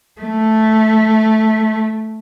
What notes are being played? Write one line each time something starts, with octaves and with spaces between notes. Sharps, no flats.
A3